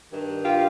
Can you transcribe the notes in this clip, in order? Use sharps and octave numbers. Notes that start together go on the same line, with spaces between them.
G2 D#3
F4 G4